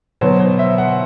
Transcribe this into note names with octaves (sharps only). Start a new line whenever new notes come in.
B2 F#3 B3 C5
C5
E5
F#5